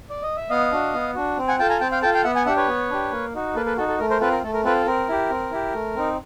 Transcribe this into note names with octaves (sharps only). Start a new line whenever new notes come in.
D5
D#5
E5
B3 D#5 F5
D4 F#4
B3
D4 F#4
C4
F#5 G#5
F4 A4 G5 A5
G#5 A#5
C4 G5 A5
F5 G5
F4 A4 G5 A5
F5 G5
B3 E5 F#5
F#5 G#5
D4 G4 E5 F#5
B4 C#5
B3
D4 G4
A#3
D#4 F#4
A#3 A4 B4
A4 B4
D#4 F#4 A4
A4
A3 A#4
A#4 C5
C4 F4 A4 B4
A#4
A3 A4
A#4
C4 F4 A4 B4
C4 A#4
E4 G4
C4
E4 G4
A3
C4 D#4